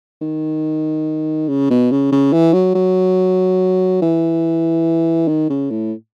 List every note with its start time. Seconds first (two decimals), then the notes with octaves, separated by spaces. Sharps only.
0.21 D#3
1.48 C#3
1.70 B2
1.91 C#3
2.12 C#3
2.33 E3
2.54 F#3
2.75 F#3
4.02 E3
5.28 D#3
5.50 C#3
5.71 A2